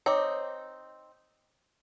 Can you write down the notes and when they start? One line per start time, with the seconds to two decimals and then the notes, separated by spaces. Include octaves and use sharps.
0.06 C4 D#4 C#5 D6